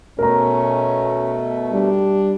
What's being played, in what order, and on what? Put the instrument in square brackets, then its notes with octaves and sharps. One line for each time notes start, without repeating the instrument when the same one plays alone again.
[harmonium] B2 A3 [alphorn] C#4 [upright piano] A#4 A#5
[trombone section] G3 [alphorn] D4